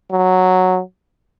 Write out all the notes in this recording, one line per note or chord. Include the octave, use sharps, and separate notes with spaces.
F#3